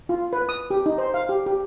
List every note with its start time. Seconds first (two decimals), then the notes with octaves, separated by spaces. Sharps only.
0.09 F4
0.33 B4
0.49 D#6
0.70 G4
0.86 D#4
0.98 C5
1.14 F5
1.29 G4
1.46 G4